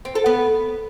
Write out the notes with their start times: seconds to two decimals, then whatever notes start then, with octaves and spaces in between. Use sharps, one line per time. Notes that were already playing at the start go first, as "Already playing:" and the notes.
0.05 C4
0.15 A4
0.26 B3